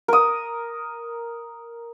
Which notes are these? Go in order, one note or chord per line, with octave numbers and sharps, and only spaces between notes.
A#4 D#6